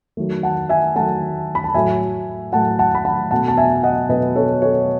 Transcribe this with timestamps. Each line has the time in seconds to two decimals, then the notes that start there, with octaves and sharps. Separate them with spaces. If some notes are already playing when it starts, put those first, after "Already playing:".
0.17 D#3 F#3 A3
0.43 F#5 A5
0.69 E5 G#5
0.95 D#3 F#3 A3 F#5 A5
1.55 B5
1.64 A5
1.74 A2 F#3 A3 E5 G#5
2.53 A2 F#3 A3 F#5 A5
2.79 F#5 A5
2.95 B5
3.05 F#5 A5
3.31 B2 A3 F#5 A5
3.48 A5
3.57 E5 G#5
3.83 D#5 F#5
4.09 B2 A3 B4 D#5
4.36 A4 C#5
4.62 A4 C#5